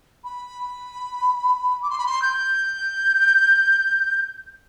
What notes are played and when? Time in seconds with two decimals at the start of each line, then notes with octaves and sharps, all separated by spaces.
0.24 B5
1.82 D6
1.90 C6
1.98 B5
2.06 C6
2.22 G6